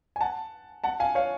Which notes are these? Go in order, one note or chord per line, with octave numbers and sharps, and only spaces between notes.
G#5
F#5 A5
F#5 A5
F5 G#5
C#5 F5